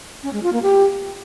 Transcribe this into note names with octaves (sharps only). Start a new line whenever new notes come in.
C#4
G#3
F4
A#3
G4